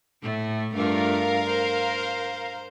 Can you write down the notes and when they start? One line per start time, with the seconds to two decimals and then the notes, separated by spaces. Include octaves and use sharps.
0.22 A2 A3
0.74 G2 A3 F4 A#4 F5
1.47 C5